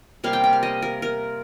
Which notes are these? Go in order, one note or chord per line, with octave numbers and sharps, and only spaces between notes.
C3 G3 A#3 F5
G5
G5
F5
D#5
A#4
A#4